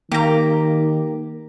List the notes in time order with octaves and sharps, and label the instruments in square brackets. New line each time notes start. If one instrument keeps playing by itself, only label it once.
[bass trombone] D#3 [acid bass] A#3 [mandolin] G4 A#5